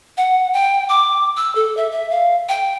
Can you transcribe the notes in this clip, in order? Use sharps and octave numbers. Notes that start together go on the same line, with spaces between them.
F#5
G5
D6
E6
A4
E5
E5
F5
G5